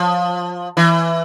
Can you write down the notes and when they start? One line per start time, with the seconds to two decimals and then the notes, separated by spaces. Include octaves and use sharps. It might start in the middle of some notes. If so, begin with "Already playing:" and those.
Already playing: F3
0.77 E3